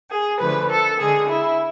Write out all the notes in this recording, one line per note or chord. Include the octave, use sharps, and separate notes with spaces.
G#4
D3 F3 A3 B4
A4
D3 G#3 G#4
E4